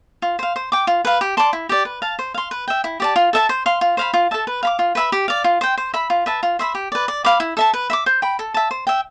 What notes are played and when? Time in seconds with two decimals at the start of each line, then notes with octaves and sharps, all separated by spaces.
0.22 F4
0.39 C5 F5
0.56 C5
0.72 G5 D6
0.87 F4
1.05 B4 F5
1.21 G4
1.37 D5 A5 C6
1.53 E4
1.69 G4 D5
1.85 B4
2.02 F5 A5
2.19 C5
2.34 F5 C6
2.51 B4
2.68 E5 G5
2.84 E4
3.00 G4 D5 A5
3.16 F4
3.33 A4 E5 A5
3.49 C5
3.66 F5 C6
3.81 F4
3.97 C5 F5 B5
4.14 F4
4.31 A4 E5 A5
4.47 B4
4.63 F5 B5 D6
4.79 F4
4.95 B4 E5 B5
5.12 G4
5.28 D5 F5
5.44 F4
5.61 C5 G5
5.77 C5
5.94 E5 B5
6.10 F4
6.26 B4 E5 A5
6.43 F4
6.59 C5 E5 B5
6.75 G4
6.92 B4 D5
7.08 D5
7.24 F5 B5 D6
7.40 E4
7.57 A4 E5 A5
7.74 B4
7.90 E5 B5 D6
8.06 C5
8.22 G5 B5
8.39 A4
8.54 E5 A5
8.71 C5
8.87 E5 G5